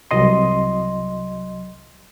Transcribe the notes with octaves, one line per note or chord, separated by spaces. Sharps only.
C2 F#3 D#5 C6